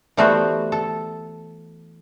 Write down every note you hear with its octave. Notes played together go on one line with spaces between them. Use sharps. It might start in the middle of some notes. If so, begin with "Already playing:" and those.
E3 G3 A3 B3 F#4 C5
A4